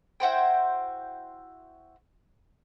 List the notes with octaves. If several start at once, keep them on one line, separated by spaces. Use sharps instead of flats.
E4 F#4 C5 G5